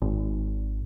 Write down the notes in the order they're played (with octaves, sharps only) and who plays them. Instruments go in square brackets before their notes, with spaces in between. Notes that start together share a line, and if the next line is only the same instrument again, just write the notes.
[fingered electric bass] G#1